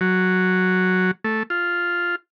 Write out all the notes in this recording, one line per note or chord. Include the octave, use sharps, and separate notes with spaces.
F#3
A3
F4